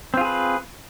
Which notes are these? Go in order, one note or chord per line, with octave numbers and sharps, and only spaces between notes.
C4 F4 G#4 B4